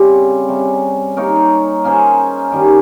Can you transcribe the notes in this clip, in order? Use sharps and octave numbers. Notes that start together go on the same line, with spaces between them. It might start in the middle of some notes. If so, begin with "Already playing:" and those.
Already playing: C#3 G3 C4
C3 G3 C#4
A#3 D#4 A#4 C#5
A#3 C#4 G#4 C5
D#3 G3 C#4